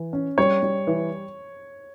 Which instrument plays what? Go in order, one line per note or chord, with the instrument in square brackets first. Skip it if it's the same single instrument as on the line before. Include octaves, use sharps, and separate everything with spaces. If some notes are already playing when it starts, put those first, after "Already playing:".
Already playing: [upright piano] E3
C#4
[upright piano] G3 [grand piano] C#5
[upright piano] G3
E3